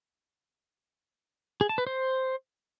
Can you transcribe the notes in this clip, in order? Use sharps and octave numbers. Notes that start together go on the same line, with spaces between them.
G#4
A5
B4
C5